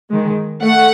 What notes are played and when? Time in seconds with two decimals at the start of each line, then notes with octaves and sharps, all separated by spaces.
0.10 D#3 G#3
0.63 A3 F#5